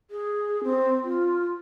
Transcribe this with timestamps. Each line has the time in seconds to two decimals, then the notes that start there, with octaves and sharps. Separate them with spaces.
0.10 G#4
0.63 C4
1.03 F4